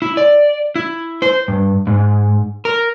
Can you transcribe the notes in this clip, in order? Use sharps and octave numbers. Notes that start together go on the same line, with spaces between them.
E4
D5
E4
C5
G2
G#2
A#4